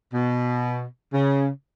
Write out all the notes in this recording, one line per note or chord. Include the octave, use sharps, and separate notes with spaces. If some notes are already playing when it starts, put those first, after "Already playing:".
B2
C#3